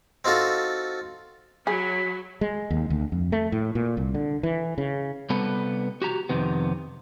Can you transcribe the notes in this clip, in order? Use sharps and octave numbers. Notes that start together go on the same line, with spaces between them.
C4 D#4 F4 F#4 A4
F#3 G#4 B5
G#3
D#2
D2
F2
A3
A2
A#2
C2
D3
E3
C#3
C3 G3 B3 A4 B4
F#4 G4 A#5
F2 C3 D#3 B3